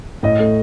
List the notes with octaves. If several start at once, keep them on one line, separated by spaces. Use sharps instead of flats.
A2 D#5
A3